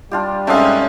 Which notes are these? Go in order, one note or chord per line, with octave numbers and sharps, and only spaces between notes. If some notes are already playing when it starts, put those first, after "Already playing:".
G3 D4 F4 G4
G#2 A3 C4 C#4 C#5 D#5 F5